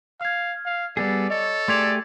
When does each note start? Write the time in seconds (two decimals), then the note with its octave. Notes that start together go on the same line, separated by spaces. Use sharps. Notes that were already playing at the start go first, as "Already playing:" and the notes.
0.21 F5 F6 G#6
0.65 F5
0.97 G3 B3 G#4 A4 D5
1.30 A4 C#5 D#5
1.68 A3 G4 G#4 D5 C6 G#6 F7